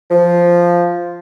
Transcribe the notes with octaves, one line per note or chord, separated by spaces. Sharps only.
F3